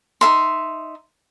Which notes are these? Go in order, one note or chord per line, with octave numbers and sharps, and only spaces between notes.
D#4 A4 E5 C6